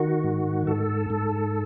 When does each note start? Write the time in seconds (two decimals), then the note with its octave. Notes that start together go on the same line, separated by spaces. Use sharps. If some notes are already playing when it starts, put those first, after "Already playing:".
Already playing: D#3 F#4
0.24 G#2
0.67 G#2 A4
1.10 G#2